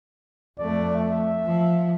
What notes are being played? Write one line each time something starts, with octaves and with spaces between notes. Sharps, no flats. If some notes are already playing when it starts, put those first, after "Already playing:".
F2 A3 D5
E5
F3